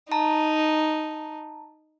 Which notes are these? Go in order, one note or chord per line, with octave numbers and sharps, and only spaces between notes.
D#4 A5 A#5